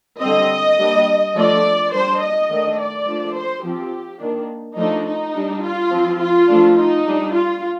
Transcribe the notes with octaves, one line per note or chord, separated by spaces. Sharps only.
D3 G3 C4 D#5
G3 A#3 D4
F3 A3 D4 D5
G3 D4 C5
D#5
D#3 A3 D4
D5
F3 A3 D4
C5
F3 C4 G4
D#3 A#3 D4
F3 A3 D4 D#4
D#4
G3 D4
F4
F3 C4
F4
F3 A3 D4
D#4
G3 D4
F4